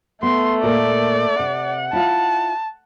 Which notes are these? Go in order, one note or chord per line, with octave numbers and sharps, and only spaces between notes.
A3 B3 C6
A#2 A#3 A#4 D5
C3 F#5
E4 F4 A5